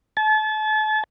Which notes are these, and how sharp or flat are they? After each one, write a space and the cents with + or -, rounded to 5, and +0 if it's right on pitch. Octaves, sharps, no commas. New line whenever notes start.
A5 -35